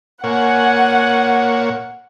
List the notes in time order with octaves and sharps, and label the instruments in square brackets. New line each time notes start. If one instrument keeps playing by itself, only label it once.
[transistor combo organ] A#2 C#5 [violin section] F#5 [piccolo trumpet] G#5